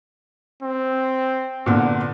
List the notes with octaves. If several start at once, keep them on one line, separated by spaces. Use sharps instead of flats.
C4
A#2 D3 B3